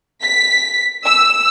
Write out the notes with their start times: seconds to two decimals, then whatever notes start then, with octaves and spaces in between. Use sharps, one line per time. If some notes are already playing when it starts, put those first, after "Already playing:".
0.22 B6
1.04 E6